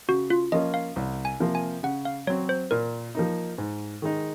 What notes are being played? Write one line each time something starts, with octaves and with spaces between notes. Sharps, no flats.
C#3 F#4
F4
F3 A#3 C#4 F4 D#5
F5
C2
G#5
C3 F3 A#3 F4
G#5
C#3 F#5
F5
F#3 C4 C#5
C5
A#2 A#4
F3 A#3 D#4
G#2
D#3 G#3 D#4